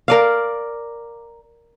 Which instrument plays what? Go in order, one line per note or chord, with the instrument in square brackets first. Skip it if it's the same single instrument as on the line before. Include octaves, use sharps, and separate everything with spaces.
[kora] A#4 D5 F5